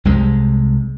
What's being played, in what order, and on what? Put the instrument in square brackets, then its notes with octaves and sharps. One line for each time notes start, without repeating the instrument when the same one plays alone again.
[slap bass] C2 C3 G#3